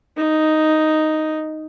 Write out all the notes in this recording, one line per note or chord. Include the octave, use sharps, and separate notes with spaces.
D#4